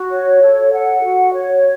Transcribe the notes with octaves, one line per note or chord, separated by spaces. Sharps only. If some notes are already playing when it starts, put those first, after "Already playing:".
Already playing: F#4
C#5
A4
F#5
F#4
C#5